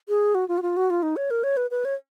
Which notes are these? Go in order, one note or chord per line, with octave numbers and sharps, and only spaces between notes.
G#4
F#4
F4
F#4
F4
F#4
F4
D#4
C#5
A#4
C#5
B4
B4
C#5